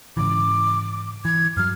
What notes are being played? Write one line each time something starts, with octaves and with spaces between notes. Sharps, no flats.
G#2 C#3 E3 D6
E3 G#6
G2 F#3 F6